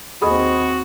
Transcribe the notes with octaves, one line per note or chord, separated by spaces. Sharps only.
D#2 C4 F#4 G#4 D#5 B5 D#6